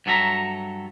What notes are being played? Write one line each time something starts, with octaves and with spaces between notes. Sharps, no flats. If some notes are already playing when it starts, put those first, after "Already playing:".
G2 F#3 A4 E5 A#5